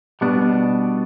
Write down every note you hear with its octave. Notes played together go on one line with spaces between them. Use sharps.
B2 G3 B3 D4